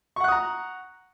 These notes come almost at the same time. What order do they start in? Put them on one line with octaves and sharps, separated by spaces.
C#6 F#5 F#6 D#6 A#5